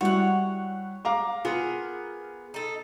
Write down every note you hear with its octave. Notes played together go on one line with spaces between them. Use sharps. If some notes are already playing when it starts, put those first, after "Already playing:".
G3 E4 F#4 C#5 F#5
F5 A#5 D6
B3 F4 G#4 A#4
D#4 A4